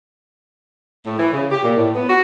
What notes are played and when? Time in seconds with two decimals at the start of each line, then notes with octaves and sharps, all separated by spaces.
1.05 A2
1.18 E3
1.32 C#3
1.51 G4
1.63 A#2
1.76 A2
1.95 B3
2.09 F#4